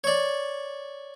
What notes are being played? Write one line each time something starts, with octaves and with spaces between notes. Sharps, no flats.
C#5 D5